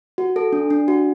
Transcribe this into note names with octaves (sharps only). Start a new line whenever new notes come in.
F#4
A4
D4
D4
F#4